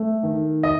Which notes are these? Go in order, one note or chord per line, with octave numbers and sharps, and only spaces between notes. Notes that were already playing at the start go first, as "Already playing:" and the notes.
Already playing: A3
D#3
D#5